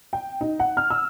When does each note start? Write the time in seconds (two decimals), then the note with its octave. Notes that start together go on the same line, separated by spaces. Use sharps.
0.13 G5
0.41 D#4
0.60 F#5
0.77 F6
0.90 E6